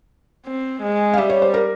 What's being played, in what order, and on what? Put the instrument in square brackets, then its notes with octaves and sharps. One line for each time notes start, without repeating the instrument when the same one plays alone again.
[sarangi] C4
G#3
[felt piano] F5
[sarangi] G3 [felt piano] E5
[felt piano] C#5
C5
A#4